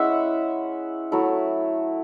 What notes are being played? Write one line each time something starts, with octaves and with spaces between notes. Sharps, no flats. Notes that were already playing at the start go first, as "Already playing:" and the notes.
Already playing: G#3 C#4 E4 E5 F#5
F#3 A3 E4